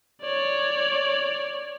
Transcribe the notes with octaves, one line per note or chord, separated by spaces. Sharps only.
C#5 D5